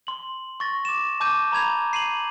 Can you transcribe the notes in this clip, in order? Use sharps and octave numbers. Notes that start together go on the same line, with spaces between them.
C6 F#7
C#6 A6 A#6
D6 E7
A5 D6 G6 D#7
A#5 B5 G#6 F7
C7 D#7 F7 F#7